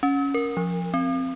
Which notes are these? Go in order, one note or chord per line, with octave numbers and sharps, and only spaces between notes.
C#4
A#4
F3
C4